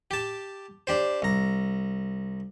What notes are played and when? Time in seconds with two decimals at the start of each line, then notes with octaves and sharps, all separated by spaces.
0.11 G4 A5
0.87 D4 G4 C5
1.22 C2 A#5